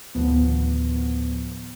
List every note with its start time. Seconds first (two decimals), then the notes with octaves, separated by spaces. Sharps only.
0.15 D2 A2 D#3 F3 B3